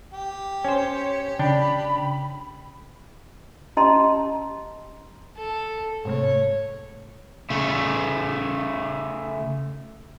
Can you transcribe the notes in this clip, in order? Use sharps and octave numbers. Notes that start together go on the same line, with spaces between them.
G4
C#4 C5 C#5
C#3 D4 G5 B5
C#4 G4 D#5 A5 A#5 C6
A4
G#2 C3 A3 C#5
C#3 A3